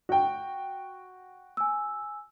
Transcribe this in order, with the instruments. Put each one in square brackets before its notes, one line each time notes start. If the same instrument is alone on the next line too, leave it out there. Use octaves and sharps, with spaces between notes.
[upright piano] F#4 G5
[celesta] G#5 E6